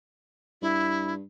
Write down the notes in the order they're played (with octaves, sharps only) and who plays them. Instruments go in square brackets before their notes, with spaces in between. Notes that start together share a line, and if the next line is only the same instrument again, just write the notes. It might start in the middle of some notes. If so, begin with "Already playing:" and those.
[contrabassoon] G2 [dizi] E4